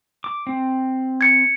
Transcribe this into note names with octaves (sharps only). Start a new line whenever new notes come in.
D6
C4
G#6 C#7